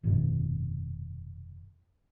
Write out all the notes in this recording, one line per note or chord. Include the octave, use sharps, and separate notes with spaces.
F1 G2 B2 D#3